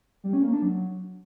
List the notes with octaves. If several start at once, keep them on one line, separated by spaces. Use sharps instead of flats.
G3
C#4
A#3
D4
F#3